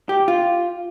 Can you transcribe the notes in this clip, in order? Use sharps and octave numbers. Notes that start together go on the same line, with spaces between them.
G4
F4